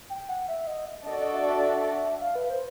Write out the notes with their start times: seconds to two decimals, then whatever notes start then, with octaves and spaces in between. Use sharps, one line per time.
0.10 G5
0.29 F#5
0.48 E5
0.67 D#5
1.06 D4 F#4 A4 D5 D#5
1.20 D#5
1.34 E5
1.49 E5
2.21 F5
2.35 B4
2.50 C5